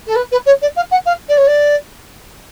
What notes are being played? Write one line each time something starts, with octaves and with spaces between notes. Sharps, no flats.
A4
B4
B4
C#5
D5
F5
F#5
F5
D5
C#5
D5